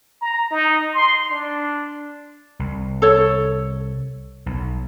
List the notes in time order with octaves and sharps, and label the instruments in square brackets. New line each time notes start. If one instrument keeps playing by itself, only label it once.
[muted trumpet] A#5
D#4
C6
D4
[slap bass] C2
[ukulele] A4 C#5
[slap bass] B1